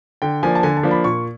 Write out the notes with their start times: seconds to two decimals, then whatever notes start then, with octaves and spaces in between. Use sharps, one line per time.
0.22 D3 G5
0.43 F3 A#3 D4 G#5
0.55 A5
0.63 D3 G#5
0.77 A5
0.83 F3 A#3 D4
0.91 B5
1.04 A#2 C#6